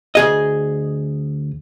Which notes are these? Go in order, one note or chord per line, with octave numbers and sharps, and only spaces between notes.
D2 G#4 D#5